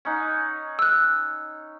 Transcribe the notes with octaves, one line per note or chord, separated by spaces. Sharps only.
C#4 D#4 F#5
E6 F#6